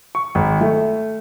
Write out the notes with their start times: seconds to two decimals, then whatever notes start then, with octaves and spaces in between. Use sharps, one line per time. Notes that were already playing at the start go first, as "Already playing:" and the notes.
0.15 C#6
0.35 G#1
0.61 A3